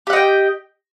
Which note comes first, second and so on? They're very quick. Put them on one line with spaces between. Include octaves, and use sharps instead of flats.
G4 F#5 D#5 G5